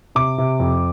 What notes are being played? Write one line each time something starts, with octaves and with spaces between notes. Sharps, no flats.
C3 D6
C3
F2